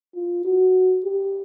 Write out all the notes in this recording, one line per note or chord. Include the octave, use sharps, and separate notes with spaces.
F4
F#4
G4